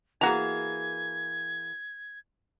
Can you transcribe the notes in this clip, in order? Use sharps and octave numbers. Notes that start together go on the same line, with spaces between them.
E3 A#3 F#4 G#4 A#5 G#6